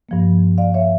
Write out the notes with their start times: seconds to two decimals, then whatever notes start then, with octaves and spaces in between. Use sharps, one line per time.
0.09 G2 F3 A#3
0.58 D5 F5
0.74 C#5 E5